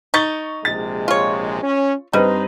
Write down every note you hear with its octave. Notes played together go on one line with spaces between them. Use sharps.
D#4 C#6 A6 G7
A#1 C3 G#3 A6
F4 C#5
C#4
G2 G3 C4 D#4 B4 C5 D#5